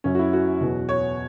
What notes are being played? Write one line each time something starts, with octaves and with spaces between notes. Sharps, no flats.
F#2 F#3 C#4
F#4
E4
F#4
E2 B2 F#3
C#5